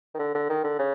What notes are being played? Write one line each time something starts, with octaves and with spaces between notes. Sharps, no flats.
D#3
D3
D3
D#3
D3
C#3